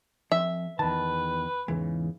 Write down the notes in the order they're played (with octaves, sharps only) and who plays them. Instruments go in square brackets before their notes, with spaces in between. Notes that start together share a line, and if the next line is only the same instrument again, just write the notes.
[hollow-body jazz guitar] F2 [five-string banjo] E5
[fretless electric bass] E2 D#3 [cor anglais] B4 [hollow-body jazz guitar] A5
[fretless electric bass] E2 G#2 C#3 [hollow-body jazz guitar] E3